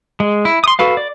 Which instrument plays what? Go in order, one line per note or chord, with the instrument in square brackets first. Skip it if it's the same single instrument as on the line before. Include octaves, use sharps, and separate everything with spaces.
[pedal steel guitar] G#3
E4
C6 D#6
F#4 A4 B4 F5
D5